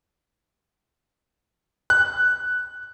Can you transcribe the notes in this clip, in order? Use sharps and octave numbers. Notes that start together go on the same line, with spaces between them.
F#6